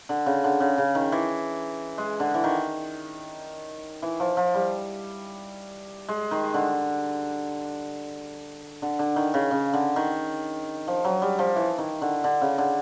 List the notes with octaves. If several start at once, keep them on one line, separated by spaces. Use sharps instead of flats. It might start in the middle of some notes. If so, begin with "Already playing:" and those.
D3
C#3
D3
C#3
C#3
D#3
E3
G#3
D3
E3
D#3
E3
F3
F3
G3
G#3
D#3
D3
D3
D3
D#3
C#3
C#3
D3
D#3
F3
F#3
G3
F3
E3
D#3
D3
D3
C#3
D3